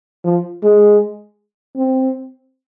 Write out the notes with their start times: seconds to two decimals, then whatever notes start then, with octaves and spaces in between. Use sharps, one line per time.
0.24 F3
0.63 G#3
1.77 C4